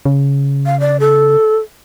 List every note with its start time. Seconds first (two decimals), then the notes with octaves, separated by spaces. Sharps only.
0.05 C#3
0.66 F5
0.80 D5
1.00 A4